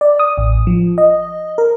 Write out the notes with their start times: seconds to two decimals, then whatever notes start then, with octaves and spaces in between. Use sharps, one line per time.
0.01 D5
0.19 D#6
0.38 A1
0.67 F3
0.98 D#5
1.58 A#4